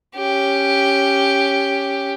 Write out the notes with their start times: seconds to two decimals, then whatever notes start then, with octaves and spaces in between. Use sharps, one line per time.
0.15 C#4 G4